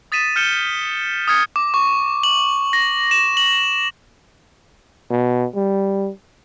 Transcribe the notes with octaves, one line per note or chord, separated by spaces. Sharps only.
D#6 A6 B6 D#7 E7
F6 G6 C#7 E7 G7
D#6 F6 G#6 C#7
D6
C#6
F#7
A#6
E7
F#7
B2
G3